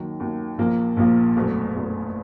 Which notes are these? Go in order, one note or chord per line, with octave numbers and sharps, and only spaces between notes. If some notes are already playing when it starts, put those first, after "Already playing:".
Already playing: D#2 D#3 F#3
D#2 D#3 F#3
A#1 A#2 F3 A#3
A#1 A#2 F3 A#3
F#1 E2 B2 F#3 A3
F#1 E2 B2 F#3 A3